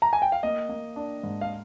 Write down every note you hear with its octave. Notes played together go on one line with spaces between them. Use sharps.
A#5
G#5
G5
F5
A#3 D#5
A#3
D4
G#2
F5